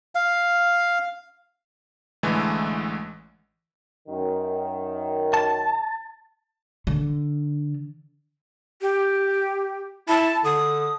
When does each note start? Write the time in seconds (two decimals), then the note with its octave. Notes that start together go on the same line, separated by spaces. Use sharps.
0.15 F5
2.23 A1 D3 E3 G#3 A3
4.08 F#2 D#3
5.34 A5
6.87 D3
8.81 G4
10.09 E4 A5
10.45 D3 D#6